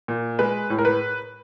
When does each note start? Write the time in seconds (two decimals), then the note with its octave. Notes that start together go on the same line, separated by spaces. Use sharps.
0.08 A#2
0.39 G#3 B4
0.70 A2
0.79 A#4
0.85 B4